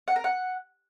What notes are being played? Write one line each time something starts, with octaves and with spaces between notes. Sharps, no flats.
F#5
A#4
F#5